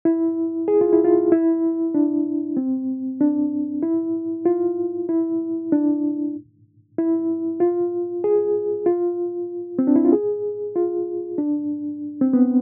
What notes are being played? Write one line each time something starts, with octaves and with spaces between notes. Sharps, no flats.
E4
G#4
F4
E4
F4
E4
D4
C4
D4
E4
F4
E4
D4
E4
F4
G#4
F4
C4
D4
E4
F4
G#4
F4
D4
C4
B3